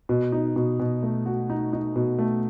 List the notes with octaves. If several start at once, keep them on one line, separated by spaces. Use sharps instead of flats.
B2
D#4
B2
B2
A3
F#4
D#4
D#4
B2
A3